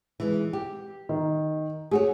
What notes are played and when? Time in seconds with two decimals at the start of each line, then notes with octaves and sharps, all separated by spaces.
0.20 E3 G#3
0.53 G4
1.09 D#3
1.91 A3 F#4 G#4 C#5